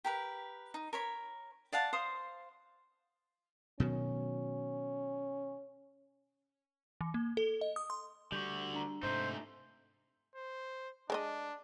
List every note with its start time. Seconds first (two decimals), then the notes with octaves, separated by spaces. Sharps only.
0.04 G4 A#4 B4
0.74 D#4
0.93 A#4 C#5 B5
1.73 D5 F5 F#5 A5
1.93 C5 F5 D#6
3.80 B2 D#3 F#3 C#4
7.01 E3
7.14 A#3
7.37 A4
7.61 D#5
7.76 D#6
7.90 C6
8.32 D3 G3 F#4 G6
8.74 D4 A#5
9.03 G#2 C3 A3 D#4 C5
10.35 C5
11.10 G#3 D4 C5 D#5